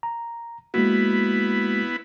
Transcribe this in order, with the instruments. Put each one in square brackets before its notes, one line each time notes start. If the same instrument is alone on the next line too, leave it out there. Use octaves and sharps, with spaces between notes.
[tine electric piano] A#5
[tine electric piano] G#3 A#3 F#4 [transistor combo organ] B3 E4